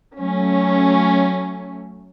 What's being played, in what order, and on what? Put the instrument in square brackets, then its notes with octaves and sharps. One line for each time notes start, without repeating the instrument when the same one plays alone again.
[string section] F#3 A3 C#4